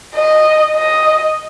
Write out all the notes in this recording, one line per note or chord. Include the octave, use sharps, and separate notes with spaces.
D#5
D#5